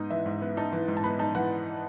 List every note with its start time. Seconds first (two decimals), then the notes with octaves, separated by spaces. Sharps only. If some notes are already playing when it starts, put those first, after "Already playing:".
Already playing: G#2 B3 D#4 D#5
0.10 E3 E5
0.26 G#2
0.41 B3
0.57 D#4 A5
0.72 E3
0.88 G#2
0.97 A5
1.04 B3 B5
1.19 D#4 A5
1.35 E3 F#5